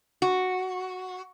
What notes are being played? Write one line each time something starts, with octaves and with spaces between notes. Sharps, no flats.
F#4